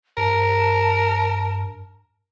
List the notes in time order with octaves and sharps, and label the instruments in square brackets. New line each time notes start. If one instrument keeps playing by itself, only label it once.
[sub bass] G2 [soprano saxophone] A#4 [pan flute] A5